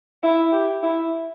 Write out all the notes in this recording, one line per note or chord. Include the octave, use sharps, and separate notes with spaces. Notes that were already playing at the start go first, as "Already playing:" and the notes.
E4
G4
E4